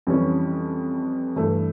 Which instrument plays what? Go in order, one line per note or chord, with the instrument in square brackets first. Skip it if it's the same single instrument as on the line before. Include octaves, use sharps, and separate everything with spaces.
[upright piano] F2 E3 G3 C#4
G2 E3 A3